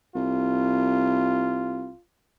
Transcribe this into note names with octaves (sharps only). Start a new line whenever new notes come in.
C2 F4